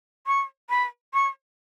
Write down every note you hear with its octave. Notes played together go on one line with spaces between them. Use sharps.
C#6
B5
C#6